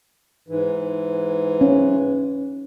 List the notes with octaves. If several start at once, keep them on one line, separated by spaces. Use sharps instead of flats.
G#2 E3
C#4